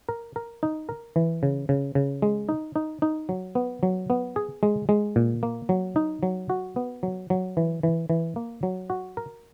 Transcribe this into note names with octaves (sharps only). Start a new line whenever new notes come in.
A#4
A#4
D#4
A#4
E3
C#3
C#3
C#3
G#3
D#4
D#4
D#4
F#3
B3
F#3
B3
G#4
G#3
G#3
A#2
A#3
F#3
D#4
F#3
F#4
B3
F#3
F#3
E3
E3
E3
A#3
F#3
F#4
A#4